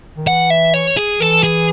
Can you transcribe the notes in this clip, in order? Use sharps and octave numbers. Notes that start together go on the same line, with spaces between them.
D#3
E3 F#5
E5
C#5
G#4
E3 A4
G#4